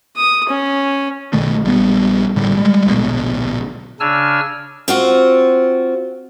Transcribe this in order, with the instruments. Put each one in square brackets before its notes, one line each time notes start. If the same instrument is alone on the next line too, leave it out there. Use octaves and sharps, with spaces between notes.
[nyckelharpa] D#6
C#4
[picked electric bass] B1 B2 D#3 A3
A#1 G3 B3
A1 A2 D3 G3
G3 G#3
D1 A#1 B2
[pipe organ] C#3 D4 G#5 E6 F6
[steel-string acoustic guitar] C4 F4 F#4